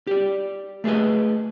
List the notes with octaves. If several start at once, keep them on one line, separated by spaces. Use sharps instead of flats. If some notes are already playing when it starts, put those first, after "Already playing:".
G4 D5
A3 G#4 A4 B4 D#5